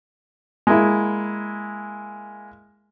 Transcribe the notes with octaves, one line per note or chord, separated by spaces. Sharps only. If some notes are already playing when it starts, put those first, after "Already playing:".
G#3 A#3 E4